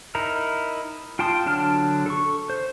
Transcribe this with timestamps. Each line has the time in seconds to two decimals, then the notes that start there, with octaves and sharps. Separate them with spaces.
0.15 D#4 E4 A#4 A#5
1.19 F4 G5 A5 C6 D#6
1.45 D3 F#3 D4 A5 F6
2.06 A4 C#6
2.50 C5